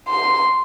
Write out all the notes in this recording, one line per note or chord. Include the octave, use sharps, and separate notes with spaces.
C6